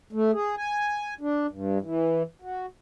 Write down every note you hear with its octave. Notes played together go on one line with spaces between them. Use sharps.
A3
G#4
G#5
D4
G2
E3
F#4